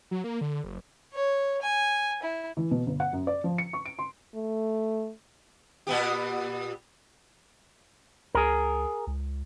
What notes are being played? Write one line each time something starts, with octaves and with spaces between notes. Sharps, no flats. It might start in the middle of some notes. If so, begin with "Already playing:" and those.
F#3
A#3
D3
F#1
C#5
G#5
E4
E3
B2
G1
F#5
F#2
D5
F3
C#7
C#6
D7
C6
A3
A#2 B3 G4
C#2 G#4 A#4
C#2